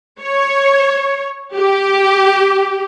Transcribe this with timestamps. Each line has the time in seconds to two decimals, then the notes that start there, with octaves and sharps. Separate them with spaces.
0.21 C#5
1.56 G4